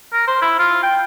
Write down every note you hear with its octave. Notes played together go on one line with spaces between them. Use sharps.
A#4
C5
E4
F4
G5